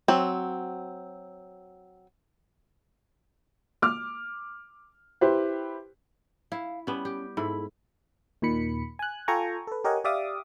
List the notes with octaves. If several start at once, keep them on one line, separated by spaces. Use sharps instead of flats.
F#3 C4
D6 F6
E4 G4 B4 C5
E4 F5
G3 B3 C#4
G4
G#2 E4 A4 B5
D#2 A#2 D#3 B5 C#7
G#5 F#6
F4 A4 G5 G#5 A#5 C#6
A4 B4
G4 A#4 C#5 D#5 F#5 G#5
G4 D5 E5 F5 D6 D#6